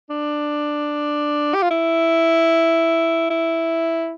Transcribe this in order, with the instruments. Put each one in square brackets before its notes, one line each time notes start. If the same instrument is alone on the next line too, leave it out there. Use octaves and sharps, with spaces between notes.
[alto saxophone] D4
G4
F4
E4
E4